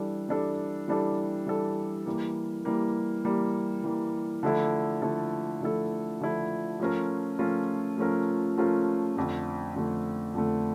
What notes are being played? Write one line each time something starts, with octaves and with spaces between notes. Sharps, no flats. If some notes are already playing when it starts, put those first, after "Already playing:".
Already playing: E3 G3 D4 A4
E3 G3 D4 A4
E3 G3 D4 A4
E3 G3 D4 A4
E3 G3 A#3
E3 G3 A#3
E3 G3 A#3
E3 G3 A#3
D3 F3 A3 E4 A4
D3 F3 A3 E4 A4
D3 F3 A3 E4 A4
D3 F3 A3 E4 A4
F3 A3 C#4 F4 A#4
F3 A3 C#4 F4 A#4
F3 A3 C#4 F4 A#4
F3 A3 C#4 F4 A#4
F2 D3 A3
F2 D3 A3
F2 D3 A3